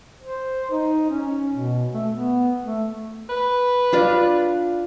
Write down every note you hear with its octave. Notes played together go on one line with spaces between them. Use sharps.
C5
D#4
C#4
B2
A3
B3
A3
B4
D4 F4 D5